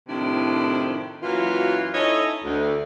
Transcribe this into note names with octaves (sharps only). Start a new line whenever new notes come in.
A2 C3 D#3 F3 D4 E4
F#2 E3 F#3 A#3 F4
C#4 D#4 E4 A4 C#5 D#5
D2